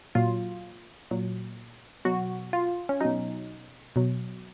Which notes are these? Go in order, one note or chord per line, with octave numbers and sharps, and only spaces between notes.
A#2 F#3 F4
A#2 F#3
B2 F#3 F#4
F4
C#4
B2 F#3 D#4
B2 F#3